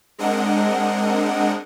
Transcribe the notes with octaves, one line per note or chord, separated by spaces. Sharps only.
G#3 C4 D4 A#4 D#5 F#5